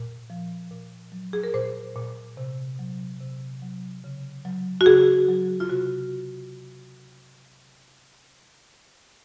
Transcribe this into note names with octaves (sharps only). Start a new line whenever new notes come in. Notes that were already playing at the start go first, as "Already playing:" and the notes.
Already playing: A#2
F3
A#2
F#3
G#4
A#4
A#2 C5
A#2
C3
F#3
C3
F#3
C#3
F#3
F#4
C#3 G#4
F#3
F4
C3 F#4